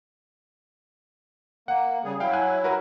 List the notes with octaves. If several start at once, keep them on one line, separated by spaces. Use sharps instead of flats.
A#3 F#5
C#3 G3 G#4
F#3 E4 F5 G5
G#5 F#6
F#4 A#4 B4